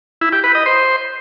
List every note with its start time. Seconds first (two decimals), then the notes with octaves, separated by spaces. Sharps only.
0.21 E4
0.33 G4
0.44 B4
0.55 D#5
0.66 C5